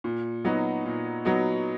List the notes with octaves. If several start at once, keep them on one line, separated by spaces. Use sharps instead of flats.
A#2
F#3 B3 D#4 F#4
A#2
F#3 B3 D#4 F#4